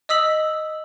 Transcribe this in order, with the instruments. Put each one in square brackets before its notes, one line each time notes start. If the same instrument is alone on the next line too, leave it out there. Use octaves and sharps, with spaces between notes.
[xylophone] D#5 D#6 E6 B6 F#7